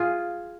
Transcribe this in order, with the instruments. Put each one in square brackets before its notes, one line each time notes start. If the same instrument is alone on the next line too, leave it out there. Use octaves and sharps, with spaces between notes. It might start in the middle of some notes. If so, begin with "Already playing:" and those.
Already playing: [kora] F4 G#4